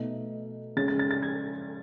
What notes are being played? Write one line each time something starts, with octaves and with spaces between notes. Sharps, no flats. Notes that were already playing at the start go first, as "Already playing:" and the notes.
Already playing: B2 A3 D#4
C#3 G#3 C#4 A6
A6
A6
A6
G#6